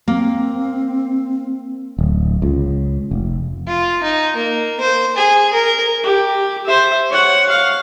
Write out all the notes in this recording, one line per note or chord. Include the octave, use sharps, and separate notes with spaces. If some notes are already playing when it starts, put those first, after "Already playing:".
A#3 C4
D1
C#2
F1
F4
D#4
A#3
C5
G#4
A#4
G4
C5 E5
C#5 F#5
F5